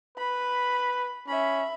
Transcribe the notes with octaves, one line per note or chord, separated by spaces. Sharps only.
B4 B5
C#4 E5 B5